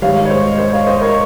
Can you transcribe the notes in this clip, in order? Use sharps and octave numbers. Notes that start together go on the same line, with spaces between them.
G#2 D#3 G3 C#5 F5
C#5
C5 D#5
C5 D#5
C#5 F5
C5 D#5
A#4 C#5